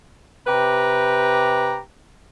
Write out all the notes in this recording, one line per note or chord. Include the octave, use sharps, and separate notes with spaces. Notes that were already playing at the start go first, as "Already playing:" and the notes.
C3 G4 B4 A#5